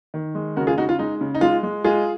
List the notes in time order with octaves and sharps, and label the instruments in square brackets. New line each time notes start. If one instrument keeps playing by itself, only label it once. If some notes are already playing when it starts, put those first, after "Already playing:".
[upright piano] D#3
G#3
C#3 F#4 A#4
F4 G#4
C#3 D#4 F#4
F4
G#3 D#4
C#3
D#4
G#3 F4
G#3
G#3 F4 G#4